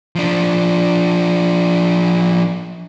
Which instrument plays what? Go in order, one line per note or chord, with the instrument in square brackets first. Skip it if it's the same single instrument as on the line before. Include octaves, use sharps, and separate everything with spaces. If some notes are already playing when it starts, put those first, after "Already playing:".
[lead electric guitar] F3 D4